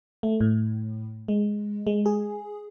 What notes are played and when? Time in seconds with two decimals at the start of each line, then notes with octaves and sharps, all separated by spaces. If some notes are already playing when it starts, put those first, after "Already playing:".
0.23 A3
0.41 A2
1.28 G#3
1.87 G#3
2.06 G#4